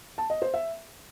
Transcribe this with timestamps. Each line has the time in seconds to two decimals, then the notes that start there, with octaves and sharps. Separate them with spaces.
0.18 A5
0.30 D#5
0.42 C5
0.54 E5